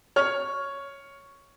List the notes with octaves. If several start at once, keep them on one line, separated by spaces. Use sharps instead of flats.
C#5 F6